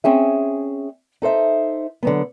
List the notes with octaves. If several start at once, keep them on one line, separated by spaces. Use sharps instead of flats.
C4 C#4 G#4 E5
D#4 A4 C5 E5
D3 F#3 B3